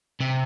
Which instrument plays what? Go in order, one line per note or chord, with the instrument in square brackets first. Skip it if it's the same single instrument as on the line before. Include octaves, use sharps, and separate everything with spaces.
[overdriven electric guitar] C3